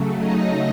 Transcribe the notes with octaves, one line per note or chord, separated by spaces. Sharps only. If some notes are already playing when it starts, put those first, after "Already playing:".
Already playing: C#3 F#3 A3
D#4 D#5